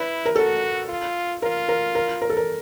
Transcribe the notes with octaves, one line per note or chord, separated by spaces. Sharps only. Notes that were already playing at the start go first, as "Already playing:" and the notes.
Already playing: E4 B4
A#4
F#4 A4
F4
F4 A#4
A#4
A#4
A#4
A4
A#4